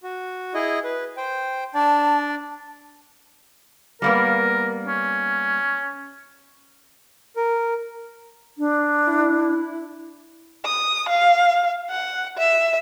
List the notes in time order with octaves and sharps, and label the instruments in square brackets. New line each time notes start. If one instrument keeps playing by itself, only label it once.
[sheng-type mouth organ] F#4
E4 G#4 D#5
B4
C5 G5
[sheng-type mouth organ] D4 D5 [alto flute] A5
[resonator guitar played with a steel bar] G3 A#3 B3 [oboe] A#4
[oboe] C#4
[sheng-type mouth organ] A#4
[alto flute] D4
[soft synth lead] E4
[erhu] D#6
F5
F#5
E5